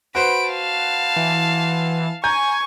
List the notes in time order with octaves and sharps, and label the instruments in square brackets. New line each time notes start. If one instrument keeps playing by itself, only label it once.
[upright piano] F#4 B4 C5 [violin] B5 D7
[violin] F5 A5
[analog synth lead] E3
[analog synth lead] G#5 [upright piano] A#5 G6 [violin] C#6